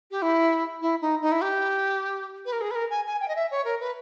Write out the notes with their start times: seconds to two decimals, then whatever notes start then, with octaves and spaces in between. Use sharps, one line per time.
0.11 G4
0.22 E4
0.82 E4
1.02 D#4
1.22 D#4
1.32 E4
1.42 G4
2.46 B4
2.53 A#4
2.61 G#4
2.71 B4
2.75 A#4
2.90 G#5
3.06 G#5
3.21 G5
3.28 D#5
3.36 E5
3.51 C#5
3.65 A#4
3.80 B4